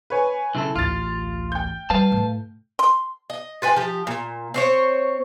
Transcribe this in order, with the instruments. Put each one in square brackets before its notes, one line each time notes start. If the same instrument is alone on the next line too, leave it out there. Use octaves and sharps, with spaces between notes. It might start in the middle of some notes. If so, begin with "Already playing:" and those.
[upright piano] B4 C#5 G#5
[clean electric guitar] B1 C#3 A4 [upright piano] E4
[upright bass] A1 D2 [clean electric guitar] F4 [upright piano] F6 A6
[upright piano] G5 G6
[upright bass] G3 [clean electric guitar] B4 F5 A5
[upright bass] A2
[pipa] C6
[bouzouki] D#5
F4 B4 G5 G#5
F3 G4
A#2
C4 C5 C#5